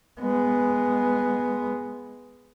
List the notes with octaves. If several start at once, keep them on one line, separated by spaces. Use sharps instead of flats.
G#3 B3